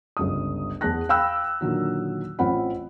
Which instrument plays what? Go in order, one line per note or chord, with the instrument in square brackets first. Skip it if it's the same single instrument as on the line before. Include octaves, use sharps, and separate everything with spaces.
[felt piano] G1 C#2 D#6
E2 B3 G#4 A5 F#6 A#6
F5 G5 B5 E6 F#6
A#2 D3 D#3 F#3
A1 C4 F4 C5 F#5 B5